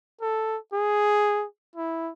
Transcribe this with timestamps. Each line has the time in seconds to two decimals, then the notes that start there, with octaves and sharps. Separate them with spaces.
0.21 A4
0.73 G#4
1.76 E4